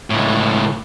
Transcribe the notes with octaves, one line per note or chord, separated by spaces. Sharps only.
C#2 A2